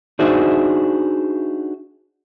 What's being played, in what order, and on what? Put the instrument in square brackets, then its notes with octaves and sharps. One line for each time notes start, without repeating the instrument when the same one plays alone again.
[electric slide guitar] D4 D#4 F#4 G#4 C5 E5